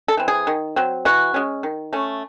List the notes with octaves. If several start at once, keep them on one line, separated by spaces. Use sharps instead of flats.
A4
E3 C4
G#4
D#3
F#3 C4
E3 F#4
G#3 C#4
D#3
A3 C#4